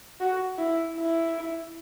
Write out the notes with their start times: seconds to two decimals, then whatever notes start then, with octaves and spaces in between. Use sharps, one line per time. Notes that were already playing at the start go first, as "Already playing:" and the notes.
0.20 F#4
0.58 E4
0.97 E4